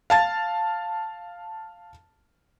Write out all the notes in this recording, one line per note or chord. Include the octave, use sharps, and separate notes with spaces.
F5 A5 A6